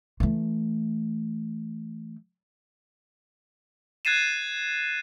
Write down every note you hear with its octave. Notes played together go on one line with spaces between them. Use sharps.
E3 A3
F#6 G#6 A6 C7 D#7 E7